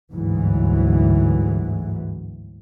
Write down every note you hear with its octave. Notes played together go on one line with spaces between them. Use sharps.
G1 D2 G#2 E3 F#3